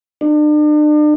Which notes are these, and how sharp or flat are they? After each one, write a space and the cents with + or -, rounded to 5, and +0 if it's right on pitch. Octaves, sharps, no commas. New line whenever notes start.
D4 +40